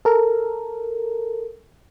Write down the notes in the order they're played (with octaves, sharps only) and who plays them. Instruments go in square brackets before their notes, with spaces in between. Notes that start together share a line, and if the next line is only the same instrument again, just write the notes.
[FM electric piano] A4 A#4